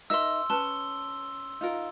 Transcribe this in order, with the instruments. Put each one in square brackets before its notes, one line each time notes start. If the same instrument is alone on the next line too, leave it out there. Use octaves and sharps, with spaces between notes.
[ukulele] D#4 A#4 E5 [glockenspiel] C6 E6
[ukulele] C#4 B4 A5 [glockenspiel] G7
[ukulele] D#4 F4 A#4